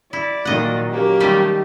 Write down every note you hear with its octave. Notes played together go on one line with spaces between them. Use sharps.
E4 D5
A#2 D#3 F#3 D#5 F#5
F#3 A#3 C#4 G4
D#3 G3 A3